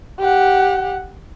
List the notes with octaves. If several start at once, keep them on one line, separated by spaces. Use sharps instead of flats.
G4 F#5